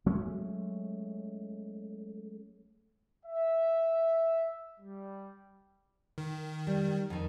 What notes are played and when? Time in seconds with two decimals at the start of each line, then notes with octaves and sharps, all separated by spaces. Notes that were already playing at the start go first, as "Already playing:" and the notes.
0.06 F#3 G#3 A3 C#4
3.24 E5
4.79 G3
6.18 D#3
6.67 G3
7.10 F2 D#3